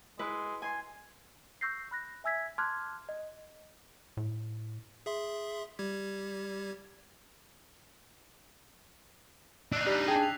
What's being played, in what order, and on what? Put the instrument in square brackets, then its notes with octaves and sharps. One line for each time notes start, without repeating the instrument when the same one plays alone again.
[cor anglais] G#3 [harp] E4 B4
[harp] G#5 C6
[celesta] C#6 E6 G6 A#6 C7
B5 F#6 A#6
E5 G#5 E6 G#6 B6
A5 C6 D6 F6 F#6 G#6
D#5
[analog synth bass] A2
[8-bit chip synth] G#4 E5 C6
G3 G4 G#6
[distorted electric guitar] D4 D#4 [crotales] E6 F#6 C7
[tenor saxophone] G3 [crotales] D6 A#6 B6
[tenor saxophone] G#4 [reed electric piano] G5 A5
[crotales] F7